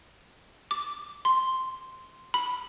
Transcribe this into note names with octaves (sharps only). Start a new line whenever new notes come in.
D6
C6
B5